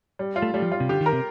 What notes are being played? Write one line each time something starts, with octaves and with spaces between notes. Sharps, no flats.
G3
F4
A3
G3 A3
F3
F4
C3
D3 G4
D#3
A#4
C3